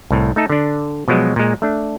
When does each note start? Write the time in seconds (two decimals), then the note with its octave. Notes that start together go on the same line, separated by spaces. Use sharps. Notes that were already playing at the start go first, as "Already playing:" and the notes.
0.11 C2 A2
0.36 A3 D#4 A4
0.50 D3 D4
1.08 B2 F3 F#3 G#3
1.36 A#2 G#3
1.62 A3 D4